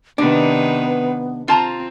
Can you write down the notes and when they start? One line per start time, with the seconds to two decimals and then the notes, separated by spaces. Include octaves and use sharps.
0.18 C3 D#3 B3 D4 B4
1.48 C4 F4 A5 A#5